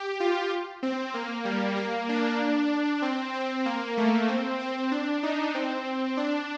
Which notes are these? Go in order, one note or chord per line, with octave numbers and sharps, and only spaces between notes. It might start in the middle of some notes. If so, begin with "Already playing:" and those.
Already playing: G4
F4
C4
A#3
G3
A#3
D4
C4
C4
A#3
A3
C4
C4
D4
D#4
C4
D4